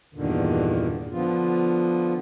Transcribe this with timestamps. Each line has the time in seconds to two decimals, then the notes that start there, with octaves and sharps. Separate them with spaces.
0.15 E2 G2 A#2 D3 D#3
1.12 D3 F3 B3 F4